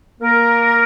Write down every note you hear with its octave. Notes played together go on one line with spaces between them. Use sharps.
A#3 A#4